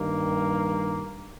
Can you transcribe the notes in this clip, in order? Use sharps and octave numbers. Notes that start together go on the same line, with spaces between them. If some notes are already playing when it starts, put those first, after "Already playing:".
Already playing: G2 D#3 A#3